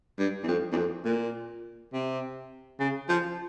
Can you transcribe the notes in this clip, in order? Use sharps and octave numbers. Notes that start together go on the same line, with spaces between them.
G2
E2
F2
E2
F2
A#2
C3
C#3
F3